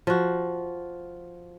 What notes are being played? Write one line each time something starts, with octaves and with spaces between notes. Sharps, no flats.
F3 F#4